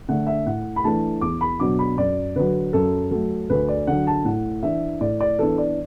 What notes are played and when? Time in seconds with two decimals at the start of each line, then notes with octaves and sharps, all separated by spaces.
0.08 D3 A3 D4 F#5
0.27 E5
0.46 A2 F#5
0.76 B5
0.84 E3 A3 D4 A5
1.21 E2 D6
1.41 B5
1.60 B2 F#3 D4 D6
1.79 B5
1.97 F#2 D5
2.36 D3 F#3 B4
2.73 F#2 A4
3.11 F#3 A3 A4
3.50 D2 B4
3.68 D5
3.87 D3 F#3 D4 F#5
4.07 A5
4.25 A2 F#5
4.63 E3 D4 E5
5.01 A2 D5
5.21 D5
5.39 E3 B3 D4 A4
5.58 D5